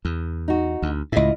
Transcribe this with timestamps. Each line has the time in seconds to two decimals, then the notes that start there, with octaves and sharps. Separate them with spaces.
0.05 E2
0.48 D#4 F#4
0.82 D2
1.12 C#2 A2 E4 F4 D#5